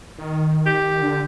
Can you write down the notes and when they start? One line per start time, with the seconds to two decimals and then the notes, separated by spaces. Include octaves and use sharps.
0.19 D#3
0.66 G4
1.02 D3